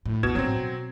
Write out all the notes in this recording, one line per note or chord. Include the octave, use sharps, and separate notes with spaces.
A2
A1 D2 B2 G#6 E7
A1 G#2 F#3 C4
B2